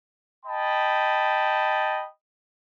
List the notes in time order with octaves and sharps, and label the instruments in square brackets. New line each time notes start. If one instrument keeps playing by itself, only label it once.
[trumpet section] D#5 G5 A5 B5